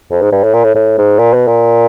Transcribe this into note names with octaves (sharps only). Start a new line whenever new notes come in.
F2
G#2
G2
A2
A#2
A2
A2
G#2
A#2
B2
A#2